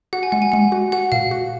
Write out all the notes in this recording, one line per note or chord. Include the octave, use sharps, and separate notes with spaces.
F#4 F#5
G#5
G#3 F#5
G#5
G#3 F#5
F#4
F#4 F#5
A#2 F5
F#4